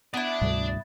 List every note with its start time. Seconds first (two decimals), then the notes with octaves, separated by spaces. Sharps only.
0.14 B3 E4 D5 A5
0.41 D2 G#2 C3 G3